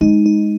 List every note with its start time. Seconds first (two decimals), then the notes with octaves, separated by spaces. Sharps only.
0.01 G#3 D#4
0.26 D#4